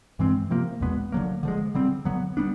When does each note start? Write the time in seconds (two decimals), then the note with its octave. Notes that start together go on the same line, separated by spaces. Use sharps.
0.19 G2 E3 G#3 C4
0.50 C3 F3 A#3
0.81 E2 B2 G#3 B3
1.12 D3 F#3 A#3
1.43 D3 F3 G#3
1.75 D3 G3 C4
2.05 D3 F#3 B3
2.37 G3 B3 D4